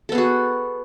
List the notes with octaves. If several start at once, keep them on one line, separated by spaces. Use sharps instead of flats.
B3 F#4 G#4 A4